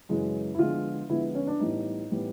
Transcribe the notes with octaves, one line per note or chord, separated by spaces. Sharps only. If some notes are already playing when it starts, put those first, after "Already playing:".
F#2 C#3 E3 G#3
E4
D3 F3 G#3 B3 F4
D3 F3 G#3 B3 E4
C#4
D4
A2 E3 G3 B3 D#4
A2 E3 G3 B3